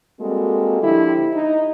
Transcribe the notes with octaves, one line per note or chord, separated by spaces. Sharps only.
G3 G#3 A#3 C4 F#4 A4
D3 F3 E4 G4
D#4